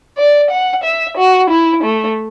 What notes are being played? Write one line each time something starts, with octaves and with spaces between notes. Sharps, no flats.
D5
F#5
E5
F#4
E4
A3